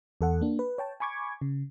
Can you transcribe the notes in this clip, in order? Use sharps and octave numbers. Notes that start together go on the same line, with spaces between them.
E2 A4 F#5
A#3 D4
B4
C#5 G5 A5
G#5 B5 C#6 D6 G#6
C#3